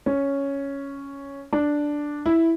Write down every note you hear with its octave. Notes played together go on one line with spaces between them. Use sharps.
C#4
D4
E4